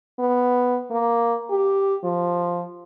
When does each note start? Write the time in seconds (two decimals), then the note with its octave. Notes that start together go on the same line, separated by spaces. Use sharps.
0.19 B3
0.91 A#3
1.50 G4
2.04 F3